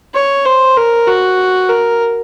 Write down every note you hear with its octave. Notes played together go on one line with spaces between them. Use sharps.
C#5
C5
A#4
F#4
A#4